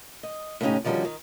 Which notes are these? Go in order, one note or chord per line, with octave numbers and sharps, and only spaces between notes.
D#5
A2 C#3 B3 C#4 D#4 G4
D3 D#3 F3 G3 C#4 F#4
D#3